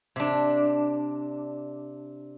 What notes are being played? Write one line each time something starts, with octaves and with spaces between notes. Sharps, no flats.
C3 D4